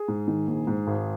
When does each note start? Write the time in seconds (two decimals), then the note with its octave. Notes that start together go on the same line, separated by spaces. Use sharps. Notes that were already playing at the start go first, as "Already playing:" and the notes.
Already playing: G#4
0.08 G#2
0.27 D#3
0.47 A#1
0.67 G#2
0.87 G#1